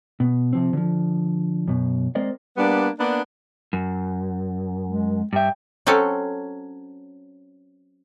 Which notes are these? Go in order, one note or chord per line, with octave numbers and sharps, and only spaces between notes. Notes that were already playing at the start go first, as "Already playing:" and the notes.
B2
C3 F3 C4
D3 F3
F#2 B2
G#3 C4 A#4 C5 D5 D#5
G3 A#3 B3 D4
A#3 B3 D4
F#2
G#3
G2 E5 G5
F#3 C4 C#4 A4